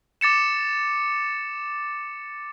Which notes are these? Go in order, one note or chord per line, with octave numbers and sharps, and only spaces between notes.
D6 A6 C#7 E7